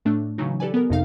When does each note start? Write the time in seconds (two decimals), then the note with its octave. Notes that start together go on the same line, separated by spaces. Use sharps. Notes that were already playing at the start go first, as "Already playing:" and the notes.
0.05 A2 A3 D4
0.38 C#3 E3 F#3 D#4
0.60 G4 A4 B4 D5 G#5
0.74 B3 A#4
0.89 G#1 F2 C3 D#4 F5